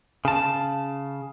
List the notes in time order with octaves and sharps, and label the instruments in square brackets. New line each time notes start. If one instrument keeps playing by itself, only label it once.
[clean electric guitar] C#3 A5